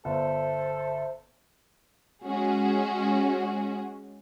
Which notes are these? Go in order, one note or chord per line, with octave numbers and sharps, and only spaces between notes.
G1 A4 C5 E5
G#3 C#4 F#4 G#4